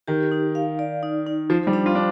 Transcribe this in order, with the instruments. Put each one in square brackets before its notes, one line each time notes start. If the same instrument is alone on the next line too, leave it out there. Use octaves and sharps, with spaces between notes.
[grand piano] D#3 [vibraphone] G4
[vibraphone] D#4
F5
D5
D#4
D#4
[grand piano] F3 [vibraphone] C5
[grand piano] G3
[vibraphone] D4
[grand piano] F4
D4